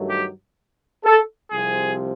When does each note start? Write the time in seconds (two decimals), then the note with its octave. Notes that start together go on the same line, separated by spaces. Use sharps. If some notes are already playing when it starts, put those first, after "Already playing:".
Already playing: G2 D#3 F#3 A3
0.10 G4
1.04 A4
1.50 C2 C3 F3 G#4